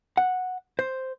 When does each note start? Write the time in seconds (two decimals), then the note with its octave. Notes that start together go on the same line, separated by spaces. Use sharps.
0.17 F#5
0.79 C5